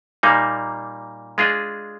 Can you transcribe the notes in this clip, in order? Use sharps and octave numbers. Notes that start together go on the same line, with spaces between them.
A#2 G3 A#3 D#4
G#3 D4 F4 G#4 D#5